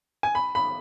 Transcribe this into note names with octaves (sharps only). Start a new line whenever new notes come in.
G#5
B5
B5